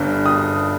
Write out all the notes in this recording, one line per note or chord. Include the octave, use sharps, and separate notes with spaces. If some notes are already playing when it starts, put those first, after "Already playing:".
Already playing: G1 G2
D#6